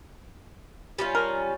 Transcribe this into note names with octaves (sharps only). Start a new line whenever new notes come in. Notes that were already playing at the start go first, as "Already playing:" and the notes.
G3 C#4 F4
A#4